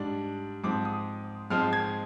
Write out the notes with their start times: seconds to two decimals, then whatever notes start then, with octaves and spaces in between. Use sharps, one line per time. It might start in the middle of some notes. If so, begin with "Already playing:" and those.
Already playing: G#2 G3 D4
0.64 G#2 F3 C4 D6
0.85 D#6
1.50 G#2 F3 G#3 C4 F6
1.73 G#6